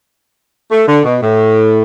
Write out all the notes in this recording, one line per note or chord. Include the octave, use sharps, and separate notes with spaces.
A3
D3
B2
A2